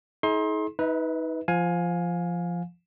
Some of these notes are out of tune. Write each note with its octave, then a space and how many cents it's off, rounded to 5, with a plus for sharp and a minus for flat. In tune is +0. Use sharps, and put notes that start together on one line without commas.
D#4 +45 G#4 +45 C6 +25
D#4 +30 B4 +0 E5 -30
F3 -15 F5 +25 G#5 +5